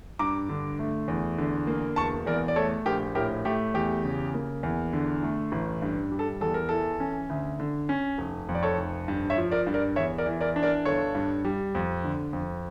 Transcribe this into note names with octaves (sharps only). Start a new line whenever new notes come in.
G2 A#5 D6
D3
A3
E2
D3
A#3
E1 A5 C#6
E2 A#4 D5
D5
A3 A4 C#5
A#1 G4 A#4
A2 G4 A#4
A3 G4
E2 G4
C#3
A#3
E2
D3
A3
A1
G2
G3
A4
E2 A4
A#4
E3 A4
C#4
D2
D3
C#4
F1
F2
D5
A4 C#5
F1
G2
C#5 E5
F3
A#4 D5
G2
A#4 D5
E2 C#5 E5
A#4 D5
E3
A#4 D5
D4
A#4 D5
G1 A4 C#5
G2
G3
F2
D3
F2